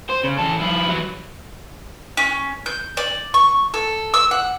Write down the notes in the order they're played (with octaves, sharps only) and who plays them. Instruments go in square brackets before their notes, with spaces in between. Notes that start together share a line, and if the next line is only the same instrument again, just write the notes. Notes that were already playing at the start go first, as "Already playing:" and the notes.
[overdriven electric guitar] C5
C#3
E3 A4
F3 E4
E3 F#3
[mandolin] C#4
G6
D5
C#6
A4
E6
F#5